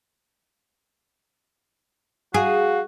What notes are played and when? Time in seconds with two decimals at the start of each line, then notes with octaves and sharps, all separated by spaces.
2.34 F#4 G#4 F5